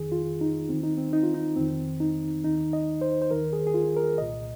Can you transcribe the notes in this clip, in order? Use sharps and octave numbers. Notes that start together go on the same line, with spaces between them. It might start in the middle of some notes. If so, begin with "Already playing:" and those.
Already playing: F2 D#3 G#4
F4
D#4
D#2 D#3 C4
D#4
C4
D#4
F4
D#4
F2 D#3 C4
D#4
D#2 D#3 D#4
D#5
C5
C5
D#2 D#3 A#4
G#4
G#4
F4
A#4
C2 A#2 D#5